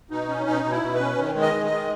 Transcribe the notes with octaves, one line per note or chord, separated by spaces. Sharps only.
B2 D#4
C#4
B2 D#4
B2
E4
B2
B4
C#4
D#3
G#3
D#5
D#3
D#5
G#3